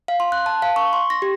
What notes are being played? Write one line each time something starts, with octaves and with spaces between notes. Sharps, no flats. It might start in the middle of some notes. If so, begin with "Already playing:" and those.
F5
C6
F#6
A5
F5
C#6
C6
A#6
G4